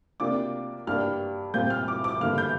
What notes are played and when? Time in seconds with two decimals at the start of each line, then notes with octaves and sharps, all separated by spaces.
0.20 C3 A#3 D4 F4 D6
0.87 G2 G3 A#3 D4 F6
1.54 A#2 G3 C4 F4 G6
1.70 F6
1.88 D6
2.04 D6
2.21 G2 D3 A#3 F6
2.38 G6